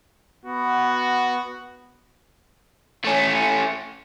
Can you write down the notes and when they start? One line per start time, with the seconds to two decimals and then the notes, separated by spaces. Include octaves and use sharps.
0.46 B3 F#4
3.05 A3 C#4